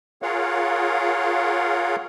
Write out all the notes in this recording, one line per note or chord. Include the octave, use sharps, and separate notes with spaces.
F4 G#4 A#4 C#5 F5 F#5